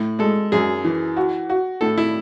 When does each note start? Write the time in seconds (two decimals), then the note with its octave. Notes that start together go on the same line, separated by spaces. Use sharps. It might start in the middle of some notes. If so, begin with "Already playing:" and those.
Already playing: A2
0.19 G#3 A4
0.52 F#2 G#4
0.84 E3
1.16 F#4
1.50 F#4
1.81 A2 A4
1.98 E4